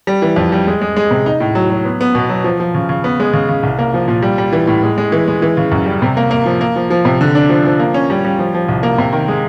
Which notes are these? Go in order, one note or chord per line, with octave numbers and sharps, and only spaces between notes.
G3
E3
F2
G3
G#3
G#3
G#3
C3
D#4
A2
F#3
F#3
B3
B3
B2
F#3
F3
F3
C#3
C#3
B3
G#3
C#3
C#3
C2
A#3
F3
A#2
G3
G3
E3
A2
G#3
G#3
E3
G#3
E3
C#3
F#2
G3
C3
A#3
A#3
F3
A#3
F3
F3
C3
D3
D4
F3
F3
A#3
C#4
G3
G3
F3
F3
C2
A#3
C3
D#3
G#3